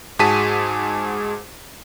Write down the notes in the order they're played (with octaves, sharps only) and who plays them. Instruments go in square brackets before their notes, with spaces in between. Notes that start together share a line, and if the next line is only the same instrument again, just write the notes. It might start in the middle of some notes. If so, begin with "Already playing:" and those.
[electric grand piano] G#2 F#4 G#4 A5 B6 D#7